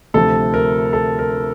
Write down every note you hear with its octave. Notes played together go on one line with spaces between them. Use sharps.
D2 C3 F3 A4
A#4
A4
A#4